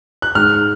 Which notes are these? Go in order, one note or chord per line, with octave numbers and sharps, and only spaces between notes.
F#6
G#2 F6